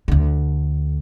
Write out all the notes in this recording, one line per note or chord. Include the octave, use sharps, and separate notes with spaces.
D2 D3